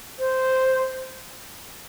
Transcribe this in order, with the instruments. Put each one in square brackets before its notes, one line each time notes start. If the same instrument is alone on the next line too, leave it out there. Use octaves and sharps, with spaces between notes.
[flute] C5